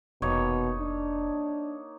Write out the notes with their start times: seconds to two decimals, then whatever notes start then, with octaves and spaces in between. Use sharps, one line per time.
0.22 F1 B2 A#3 D#4 C#5
0.80 D4